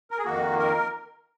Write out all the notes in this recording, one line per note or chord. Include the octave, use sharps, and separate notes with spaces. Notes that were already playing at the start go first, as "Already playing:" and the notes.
A#4
G#4
F2 D#3 A#3 F#4
A#4